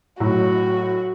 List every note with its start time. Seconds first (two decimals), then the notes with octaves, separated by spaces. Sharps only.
0.20 A2 F#3 F#4